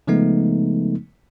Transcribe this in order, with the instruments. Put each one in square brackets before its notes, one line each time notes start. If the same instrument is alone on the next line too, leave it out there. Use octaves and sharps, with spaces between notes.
[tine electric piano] C#3 F3 G#3 A3 B3 D#4